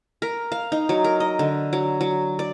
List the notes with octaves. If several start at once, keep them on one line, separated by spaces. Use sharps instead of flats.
A#4
F5
D#4
F#3
A#4
D#5
D3
F#3
F#3
D5